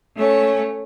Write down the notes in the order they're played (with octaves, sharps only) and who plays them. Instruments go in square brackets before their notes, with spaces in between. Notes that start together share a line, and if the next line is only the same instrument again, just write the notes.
[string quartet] A3 C#4 C#5